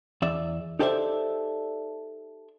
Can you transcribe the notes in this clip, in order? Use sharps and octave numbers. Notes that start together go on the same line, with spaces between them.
E2 D5 E5
D#4 G4 A4 C5 D5 E5